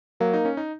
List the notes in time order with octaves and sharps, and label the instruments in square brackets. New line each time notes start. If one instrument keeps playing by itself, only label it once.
[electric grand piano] F#3 [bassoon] A#3
[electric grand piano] D#4
C#4
D#4